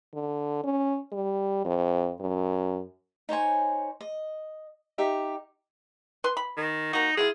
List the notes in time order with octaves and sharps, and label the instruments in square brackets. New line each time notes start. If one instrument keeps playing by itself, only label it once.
[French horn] D3
C#4
G3
F2
F#2
[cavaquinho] D#4 C5 C#5 G#5
D#5
D#4 G4 E5
[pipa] B4 C6
B5
[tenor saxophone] D#3
[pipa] A#3 F#4 [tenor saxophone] D#4
[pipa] F#3 E4 F4 [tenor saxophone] G#4